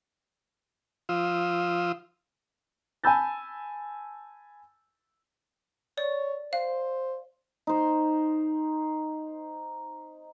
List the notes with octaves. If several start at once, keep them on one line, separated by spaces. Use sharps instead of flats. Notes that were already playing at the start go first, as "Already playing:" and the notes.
F3 F4 D#6 E6
G#5 A5 B5 E6 G6 A6
C#5 D5
C5 F5
D#4 C5